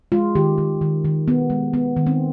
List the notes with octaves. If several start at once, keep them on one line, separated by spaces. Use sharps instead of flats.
G#3 F4
D#3 G4
D#3
D#3
D#3
B3
G#3
B3
D#3
C4